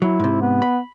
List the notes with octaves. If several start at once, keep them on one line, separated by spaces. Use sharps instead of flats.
F#3 E4
G#2 C3
B3
B5